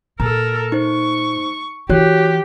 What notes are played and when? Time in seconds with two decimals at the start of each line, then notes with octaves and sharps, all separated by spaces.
0.20 A#2 A4 A#4 A#5
0.72 D#4 C5 C#6
1.89 E3 F#4 G4 C#5 F#6